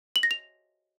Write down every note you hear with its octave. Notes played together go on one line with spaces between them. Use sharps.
F#7
A#6
F7